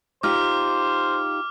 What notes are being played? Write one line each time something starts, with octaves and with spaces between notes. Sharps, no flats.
D#4 F4 G4 C5 D6 F6